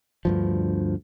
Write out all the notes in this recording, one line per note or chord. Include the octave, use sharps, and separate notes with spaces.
D2 G2 F3